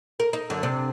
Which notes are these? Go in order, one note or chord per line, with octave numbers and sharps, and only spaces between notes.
A#4
D#4
F#2 D3
C3 D4